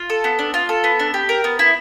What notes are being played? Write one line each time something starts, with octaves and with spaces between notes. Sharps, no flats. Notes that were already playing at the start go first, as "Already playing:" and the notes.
Already playing: F4
A4
B3
D4
F4
A4
B3
D4
G4
A#4
B3
E4